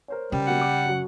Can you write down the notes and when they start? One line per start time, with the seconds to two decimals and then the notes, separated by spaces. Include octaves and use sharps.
0.08 A#4 C5 C#5
0.32 C#3 G3
0.47 B2 F#3 A#3 F#5
0.61 D6
0.85 F#2 F#3